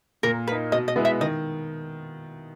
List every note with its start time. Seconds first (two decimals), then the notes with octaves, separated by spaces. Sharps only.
0.23 A#2 A#4
0.47 A#3 B4
0.52 D#4
0.72 B2 D#5
0.88 D#5
0.96 G#3 B3 E4
1.05 E5
1.21 D#3 D#5